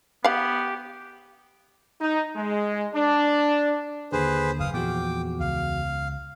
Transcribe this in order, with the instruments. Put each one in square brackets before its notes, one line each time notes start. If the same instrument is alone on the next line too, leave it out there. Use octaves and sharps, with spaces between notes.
[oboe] B3 [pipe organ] G4 [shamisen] F5 F#5
[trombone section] D#4
G#3
D4
[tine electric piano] D#2 D3 [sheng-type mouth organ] G#4 B4 C5
[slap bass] F#1 C#3 [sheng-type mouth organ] F5 D#6
[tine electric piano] E2 F#4 [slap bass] A#2 F3 [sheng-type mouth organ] G5 D6
[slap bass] C#2 [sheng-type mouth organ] F5